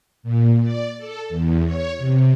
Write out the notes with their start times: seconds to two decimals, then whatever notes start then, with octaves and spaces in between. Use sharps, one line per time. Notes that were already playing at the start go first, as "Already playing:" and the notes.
0.23 A#2
0.61 D5
0.97 A4
1.29 E2
1.64 C#5
1.98 C3